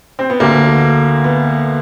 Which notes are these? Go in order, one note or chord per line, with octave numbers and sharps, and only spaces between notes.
C4
B3
D2 D3 A#3
B3